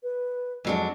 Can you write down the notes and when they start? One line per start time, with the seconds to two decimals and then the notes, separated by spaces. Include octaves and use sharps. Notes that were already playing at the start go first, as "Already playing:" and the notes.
0.03 B4
0.65 F2 F#3 G#3 D4